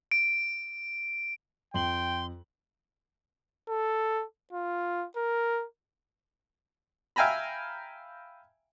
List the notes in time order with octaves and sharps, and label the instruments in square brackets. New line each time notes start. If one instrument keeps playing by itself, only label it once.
[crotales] D7
[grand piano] F2 F#7 [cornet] G5 [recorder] C6
[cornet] A4
F4
A#4
[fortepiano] E5 F5 G5 G#5 A#5 B5